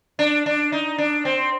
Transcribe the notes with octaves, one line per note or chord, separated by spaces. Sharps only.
D4
D4
D#4
D4
C4